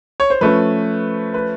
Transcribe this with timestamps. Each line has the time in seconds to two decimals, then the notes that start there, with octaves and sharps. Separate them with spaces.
0.20 C#5
0.30 C5
0.41 F3 A3 C#4 B4
1.34 B4